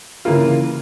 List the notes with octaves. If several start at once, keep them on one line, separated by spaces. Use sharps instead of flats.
C#3 E3 A#3 F4